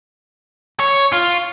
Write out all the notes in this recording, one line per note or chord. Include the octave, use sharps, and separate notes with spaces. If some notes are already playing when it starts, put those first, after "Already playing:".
C#5
F4